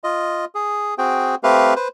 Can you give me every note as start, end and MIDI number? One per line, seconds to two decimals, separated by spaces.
0.04 0.45 65
0.04 0.45 75
0.55 0.94 68
0.98 1.35 60
0.98 1.35 66
0.98 1.35 68
0.98 1.35 79
1.43 1.74 57
1.43 1.74 60
1.43 1.74 67
1.43 1.74 71
1.43 1.74 77
1.76 1.88 71
1.76 1.88 72